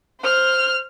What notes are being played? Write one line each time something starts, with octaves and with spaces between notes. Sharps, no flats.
C5 F6